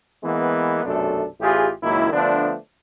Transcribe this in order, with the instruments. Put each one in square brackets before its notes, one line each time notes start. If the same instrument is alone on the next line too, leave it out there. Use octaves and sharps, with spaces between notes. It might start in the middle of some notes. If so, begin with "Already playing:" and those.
[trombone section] E3 G#3 A#3 B3
B1 F#2 C3 A3 D4 A4
A1 E4 F4 G4 G#4
C#2 F#2 D#3 A#3 E4
D3 F3 A3 B3 D4